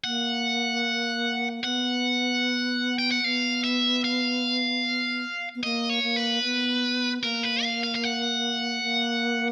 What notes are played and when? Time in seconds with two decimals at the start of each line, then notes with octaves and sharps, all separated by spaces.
0.04 A#3 F#5
1.64 B3 F#5
2.99 G5
3.11 F#5
3.24 B3 F5
3.64 E5
4.04 F5
5.55 B3
5.63 A#3 D#5
5.90 C#5
6.03 A#3
6.16 B4
6.43 B3
7.23 A#3 A#4
7.43 B4
7.63 F5
7.84 F5
7.95 F5
8.03 F#5
8.83 A#3